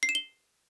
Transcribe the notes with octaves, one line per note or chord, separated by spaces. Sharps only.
C7
E7
G7